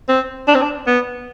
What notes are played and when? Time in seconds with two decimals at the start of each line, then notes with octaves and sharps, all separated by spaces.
0.08 C4
0.48 D4
0.55 C4
0.62 D4
0.87 B3